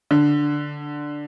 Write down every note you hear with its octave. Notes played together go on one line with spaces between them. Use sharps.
D3